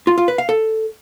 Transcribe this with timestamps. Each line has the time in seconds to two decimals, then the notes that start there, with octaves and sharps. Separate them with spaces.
0.07 F4
0.18 F4
0.28 B4
0.38 F5
0.49 A4